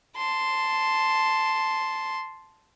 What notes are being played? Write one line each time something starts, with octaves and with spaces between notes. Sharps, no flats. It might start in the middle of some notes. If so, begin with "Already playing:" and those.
A5 C6